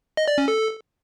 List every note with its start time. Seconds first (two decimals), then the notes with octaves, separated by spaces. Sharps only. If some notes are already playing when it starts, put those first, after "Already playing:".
0.17 D#5
0.28 D5
0.38 C#4
0.48 A4